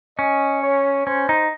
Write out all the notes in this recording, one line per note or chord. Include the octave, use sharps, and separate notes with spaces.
C#4 D#5
C#5
C#4 C5
D#4